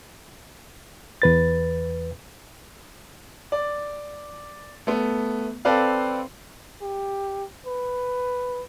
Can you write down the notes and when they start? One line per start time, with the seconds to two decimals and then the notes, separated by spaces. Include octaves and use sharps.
1.22 E2 B4 A6
3.52 D5
4.87 A3 B3
5.65 C4 A4 B4 D5 F5
6.82 G4
7.66 B4